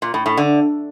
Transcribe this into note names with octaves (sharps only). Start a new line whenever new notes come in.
A#2
A2
A2
D3